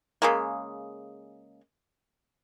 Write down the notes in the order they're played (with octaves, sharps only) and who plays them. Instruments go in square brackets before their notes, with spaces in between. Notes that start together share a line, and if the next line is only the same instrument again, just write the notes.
[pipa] C#3 G#3 A#3